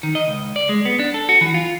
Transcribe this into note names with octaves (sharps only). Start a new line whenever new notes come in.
D#3
D#5
C#2
D5
G#3
B3
D4
A4
F#4
E3
F4